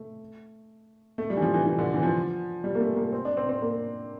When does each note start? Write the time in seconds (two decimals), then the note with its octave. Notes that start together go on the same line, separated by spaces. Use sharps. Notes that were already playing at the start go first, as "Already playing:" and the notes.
Already playing: A3
1.18 A3
1.30 G3
1.37 E3
1.42 F3
1.54 E3
1.66 E3
1.79 D3
1.94 E3
2.03 F3
2.64 G3
2.75 A#3
2.80 A3
2.96 A#3
3.12 C4
3.25 D4
3.37 C4
3.49 C4
3.62 A#3